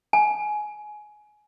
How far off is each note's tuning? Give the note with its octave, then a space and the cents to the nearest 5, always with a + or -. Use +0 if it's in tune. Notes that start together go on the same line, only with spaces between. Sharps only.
G#5 +15